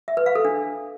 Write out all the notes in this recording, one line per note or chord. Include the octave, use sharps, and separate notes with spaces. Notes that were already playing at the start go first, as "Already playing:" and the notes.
E5
B4
F5
A4
D4